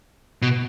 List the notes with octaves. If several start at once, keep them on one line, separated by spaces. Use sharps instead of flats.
B2